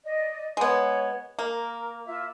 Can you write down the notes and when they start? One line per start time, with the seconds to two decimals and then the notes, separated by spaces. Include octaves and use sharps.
0.04 D5 D#5
0.57 G#3 B3 C#5
1.39 A#3 A#4
2.06 F4 E5